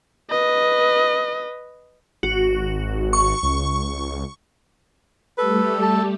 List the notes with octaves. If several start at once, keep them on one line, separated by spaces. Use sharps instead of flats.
B4 D#5
G#1 F#4
C#6
C#2
G3 A3 G4 A4 B4
A5